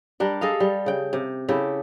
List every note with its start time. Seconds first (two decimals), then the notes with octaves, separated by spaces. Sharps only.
0.20 G3 D4 A#4
0.41 G#4 A4 D#5 F5
0.60 G3
0.86 C#3 G5
1.13 C3
1.49 C#3 E4 G4 A4